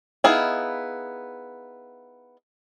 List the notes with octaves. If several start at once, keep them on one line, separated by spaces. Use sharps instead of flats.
B3 D#4 E4 G#4 F5